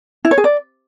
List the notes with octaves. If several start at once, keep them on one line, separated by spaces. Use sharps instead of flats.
E4
C#5
G#4
D5